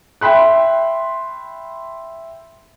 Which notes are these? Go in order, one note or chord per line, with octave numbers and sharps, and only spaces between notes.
E5 G5 B5 C6 F#6